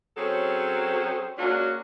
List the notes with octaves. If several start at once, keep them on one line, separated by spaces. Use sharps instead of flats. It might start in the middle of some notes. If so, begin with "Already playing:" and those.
F#3 C4 C#4 G#4 A4 C5
G#3 A#3 C#4 D4 F#4